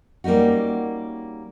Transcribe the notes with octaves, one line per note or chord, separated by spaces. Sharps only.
G3 A#3 C#4 D#4 F#4